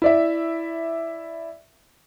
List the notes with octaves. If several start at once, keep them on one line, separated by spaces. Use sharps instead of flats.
E4 D5 E5